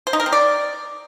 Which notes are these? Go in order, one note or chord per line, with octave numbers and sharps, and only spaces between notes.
C5
D#4
A#4
C4
D5